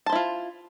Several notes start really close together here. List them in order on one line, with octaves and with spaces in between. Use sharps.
A5 C5 E4 F4